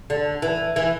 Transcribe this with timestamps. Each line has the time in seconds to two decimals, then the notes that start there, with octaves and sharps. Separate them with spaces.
0.10 D3
0.42 E3
0.76 E3